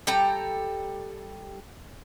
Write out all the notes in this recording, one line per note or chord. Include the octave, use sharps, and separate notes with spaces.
G3 A4 G5 A#5